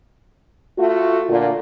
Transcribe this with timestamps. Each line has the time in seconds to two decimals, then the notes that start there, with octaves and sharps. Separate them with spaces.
0.78 A3 F4 F#4
1.28 A#2 D3